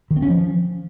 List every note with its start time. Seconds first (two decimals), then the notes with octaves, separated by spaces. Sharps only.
0.11 D#3
0.16 C4
0.22 C#4
0.28 F3